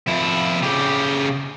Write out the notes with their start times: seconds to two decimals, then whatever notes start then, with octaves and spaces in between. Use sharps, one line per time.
0.07 F2 E4
0.63 C#3 G4